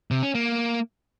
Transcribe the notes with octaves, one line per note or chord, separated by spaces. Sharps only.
C3
C#4
A#3